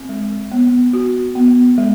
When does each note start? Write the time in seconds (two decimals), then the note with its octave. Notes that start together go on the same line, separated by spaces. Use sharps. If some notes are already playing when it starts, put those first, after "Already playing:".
Already playing: C4
0.09 G#3
0.52 B3
0.93 F#4
1.35 B3
1.78 G#3